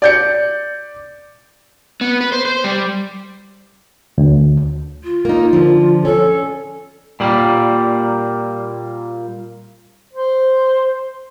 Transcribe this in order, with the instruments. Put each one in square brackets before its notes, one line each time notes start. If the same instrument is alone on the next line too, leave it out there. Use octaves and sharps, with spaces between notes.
[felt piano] D5 G6 C#7
[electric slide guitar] B3
B4
C5
C5
G3
[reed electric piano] D2
[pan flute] F4
[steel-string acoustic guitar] A#3 D#4
D3 F3
[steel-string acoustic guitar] C#4 [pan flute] A4
[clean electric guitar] A#2 G3 A#3
[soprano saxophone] C5